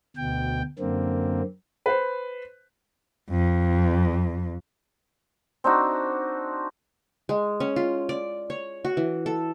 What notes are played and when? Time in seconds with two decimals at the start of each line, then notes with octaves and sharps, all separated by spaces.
0.17 D2 B2 G5
0.79 F#2 D3 A#3 C4
1.86 B4 C5
3.30 F2
5.64 C4 D4 D#4 F#4
7.29 G#3
7.60 C#4
7.76 F4
8.09 D5
8.50 C#5
8.85 F#4
8.97 E3
9.26 A4